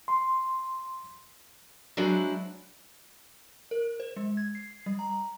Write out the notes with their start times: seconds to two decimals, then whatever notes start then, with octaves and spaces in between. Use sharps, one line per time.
0.08 C6
1.97 F#3 G#3 D4 E4 F#4 C5
3.71 A#4
4.00 C5
4.16 G#3
4.37 G#6
4.55 C7
4.86 G3
4.99 A#5